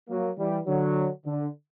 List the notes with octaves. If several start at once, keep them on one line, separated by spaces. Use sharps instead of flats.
F#3 A#3
E3 G3
D3 F#3
D3